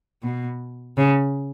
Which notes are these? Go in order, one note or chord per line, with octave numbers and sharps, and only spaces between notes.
B2
C#3